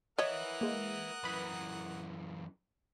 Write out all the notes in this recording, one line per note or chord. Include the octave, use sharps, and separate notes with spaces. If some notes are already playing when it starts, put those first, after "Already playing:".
A#4 B4 C#5 D#5 E5 F#5 D#6
G#3 A#3
F#2 E3 B4 B5